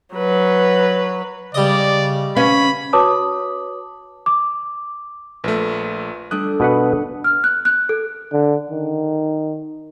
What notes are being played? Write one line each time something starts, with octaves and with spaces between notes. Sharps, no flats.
F#3 B4
C#3 G3 D5 D#5
C#4 B4 F5 B5
F#4 B4 C#5 A5 D6 D#6
D6
A#1 A3 F4 B4
G3 A3 D4 D#6 F#6
B2 B4 F#5
F6
F#6
F#6
A4
D3
D#3